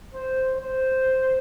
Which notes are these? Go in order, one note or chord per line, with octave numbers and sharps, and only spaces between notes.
C5
C5